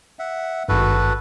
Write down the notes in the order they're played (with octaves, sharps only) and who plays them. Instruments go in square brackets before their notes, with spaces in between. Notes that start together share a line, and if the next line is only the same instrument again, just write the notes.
[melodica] E5 F#5
[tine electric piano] G#1 G2 [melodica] F#4 A4 B4